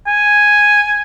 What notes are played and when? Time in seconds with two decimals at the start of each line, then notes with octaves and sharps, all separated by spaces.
0.07 G#5